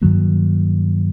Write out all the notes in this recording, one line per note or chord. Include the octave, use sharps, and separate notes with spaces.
G2 D#3 F#3 A#3